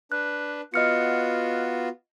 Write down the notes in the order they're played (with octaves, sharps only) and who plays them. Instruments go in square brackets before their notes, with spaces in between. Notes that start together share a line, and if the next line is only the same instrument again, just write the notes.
[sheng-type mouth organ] D4 B4 [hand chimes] F#6
[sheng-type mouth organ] B3 F4 F#4 [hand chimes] D#5 F6 C#7